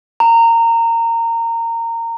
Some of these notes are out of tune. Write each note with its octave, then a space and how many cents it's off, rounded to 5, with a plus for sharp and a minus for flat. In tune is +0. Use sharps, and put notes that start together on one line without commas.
A#5 -20